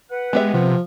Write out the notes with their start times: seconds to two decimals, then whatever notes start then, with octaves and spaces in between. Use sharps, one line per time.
0.12 B4 F#5
0.33 G#3 B3 G4 E5
0.54 C3 F3